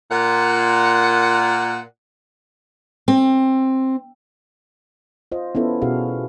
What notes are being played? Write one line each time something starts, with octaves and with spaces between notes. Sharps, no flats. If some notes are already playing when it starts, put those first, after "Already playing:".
A#2 F#5
C4
F4 C5 D#5
B3 C#4 E4 A4
B2 C#4 F4 F#4 G#4 F5